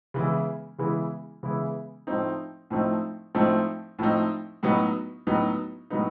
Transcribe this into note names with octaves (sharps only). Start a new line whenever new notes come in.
C#3 E3 G#3 B3 E4
C#3 E3 G#3 B3 E4
C#3 E3 G#3 B3 E4
A2 F3 A3 C4 D#4
A2 F3 A3 C4 D#4
A2 F3 A3 C4 D#4
A2 F3 A3 C4 D#4
A2 F#3 B3 D#4
A2 F#3 B3 D#4
A2 F#3 B3 D#4